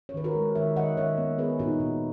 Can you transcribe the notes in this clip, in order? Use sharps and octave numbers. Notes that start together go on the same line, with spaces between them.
C#5
D#3 B4
F#4 A#4
G#3
D#3 C#5 E5
D#3 D#5 F#5
D#3 C#5 E5
B3
B3 G#4 B4
A#2 D#4 F#4
A#2